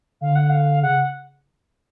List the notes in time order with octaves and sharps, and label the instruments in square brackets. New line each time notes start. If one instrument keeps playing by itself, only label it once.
[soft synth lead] D3 [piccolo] F5
[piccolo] F#5
F5
[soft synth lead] C#3 [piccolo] F#5